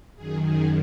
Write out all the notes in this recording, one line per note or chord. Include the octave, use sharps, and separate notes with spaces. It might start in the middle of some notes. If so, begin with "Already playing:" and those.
F#2 D#3 G#4
G#4